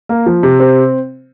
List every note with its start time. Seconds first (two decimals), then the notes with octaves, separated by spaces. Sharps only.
0.09 A#3
0.26 F3
0.43 C3
0.60 C4